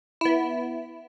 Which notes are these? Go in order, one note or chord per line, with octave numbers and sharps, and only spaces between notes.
B3 E4